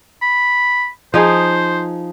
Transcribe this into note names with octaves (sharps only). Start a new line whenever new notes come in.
B5
F3 D#4 G#4 C5